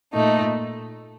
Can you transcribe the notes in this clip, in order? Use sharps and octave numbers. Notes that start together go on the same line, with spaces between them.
A#2 A3 D#4